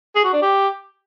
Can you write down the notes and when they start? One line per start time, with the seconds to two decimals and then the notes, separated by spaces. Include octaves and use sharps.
0.15 G#4
0.24 F#4
0.33 D4
0.42 G4